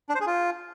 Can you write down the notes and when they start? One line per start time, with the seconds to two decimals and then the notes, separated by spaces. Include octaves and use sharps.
0.09 D4
0.15 C5
0.21 G#4
0.26 F4